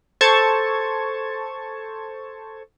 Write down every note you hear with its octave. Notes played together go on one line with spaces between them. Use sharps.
A4 C5 A5 C#6 G#6